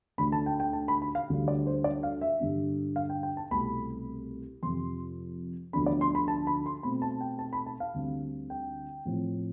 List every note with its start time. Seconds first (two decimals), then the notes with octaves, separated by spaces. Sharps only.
0.18 D2 D3 A3 D4 B5
0.32 A5
0.46 G5
0.60 G5
0.73 A5
0.88 B5
1.02 B5
1.15 F5
1.30 D2 D3 G3 D4
1.48 D5
1.67 C5
1.84 D5
2.03 F5
2.21 E5
2.40 G2 D3 G3 D4
2.96 F5
3.10 G5
3.23 G5
3.37 A5
3.51 C2 B2 A3 C4 B5
4.63 F2 C3 F3 C6
5.73 D2 D3 F3 B3 D4 B5
5.86 D5
6.01 C6
6.15 B5
6.28 A5
6.47 B5
6.66 C6
6.83 B2 A3 C4 B5
7.02 A5
7.21 G5
7.39 A5
7.53 B5
7.66 A5
7.80 F5
7.94 D2 D3 G3 C4
8.50 G5
9.05 A2 F3 C4